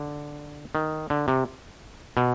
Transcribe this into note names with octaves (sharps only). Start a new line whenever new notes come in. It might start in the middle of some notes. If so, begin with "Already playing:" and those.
Already playing: D3
D#3
D3
C3
B2